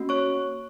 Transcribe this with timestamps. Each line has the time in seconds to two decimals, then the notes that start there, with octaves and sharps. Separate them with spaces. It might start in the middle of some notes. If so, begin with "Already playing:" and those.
Already playing: A#3 C#4 F#4
0.09 C#5 C#6